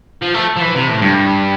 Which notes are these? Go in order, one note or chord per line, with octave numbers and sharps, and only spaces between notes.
F3
A3
F3
E3
C3
A2
G2